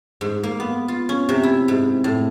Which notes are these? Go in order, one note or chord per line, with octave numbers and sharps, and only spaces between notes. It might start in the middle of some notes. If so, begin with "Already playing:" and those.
G#2
A#3
B3
F4
C#4
C3
E4
G#2
A2